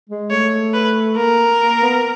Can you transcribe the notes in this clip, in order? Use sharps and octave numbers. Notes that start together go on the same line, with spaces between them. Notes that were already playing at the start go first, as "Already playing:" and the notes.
G#3
A3 C#5
B4
A#3 A#4
A#3
B3